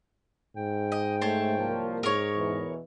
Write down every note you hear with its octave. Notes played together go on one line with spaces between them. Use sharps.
G#2 G5
D#5
A3 C5 C#5 A5
C2 F3 A#3
G#2 G#4 A#4 C#5
E2 B2 E3